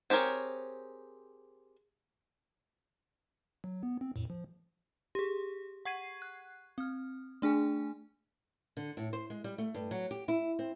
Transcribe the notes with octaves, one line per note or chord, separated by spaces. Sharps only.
C4 G4 G#4 A#4 C#5
F#3
B3
C4
F2 A2
F3
G4 G#4
F#5 C#6 G#6 C7 D#7
F#6
C4 F6
A3 D4 G#4 G#5
D3
A2
C5
G#3
G3
A3
G2
F#3
G4
E4
C4